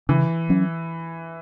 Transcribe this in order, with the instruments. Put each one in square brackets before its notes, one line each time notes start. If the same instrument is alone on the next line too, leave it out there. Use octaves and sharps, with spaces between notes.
[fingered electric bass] C#3 [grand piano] E3
[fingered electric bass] F#3 C#4